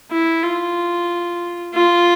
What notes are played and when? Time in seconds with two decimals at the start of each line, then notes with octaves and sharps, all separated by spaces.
0.12 E4
0.43 F4
1.74 F4